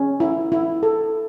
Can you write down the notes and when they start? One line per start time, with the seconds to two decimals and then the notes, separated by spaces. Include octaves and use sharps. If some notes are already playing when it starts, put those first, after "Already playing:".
Already playing: C#4
0.20 E4
0.52 E4
0.83 A4